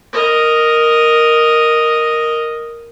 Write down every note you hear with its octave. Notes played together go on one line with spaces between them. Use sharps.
A#4 D#5